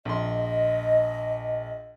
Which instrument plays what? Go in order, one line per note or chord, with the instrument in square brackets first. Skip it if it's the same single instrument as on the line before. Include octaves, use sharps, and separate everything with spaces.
[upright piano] A#1 C6 [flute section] D#5